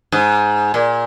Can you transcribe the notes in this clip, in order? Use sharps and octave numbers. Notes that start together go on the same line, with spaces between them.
G#2
A#2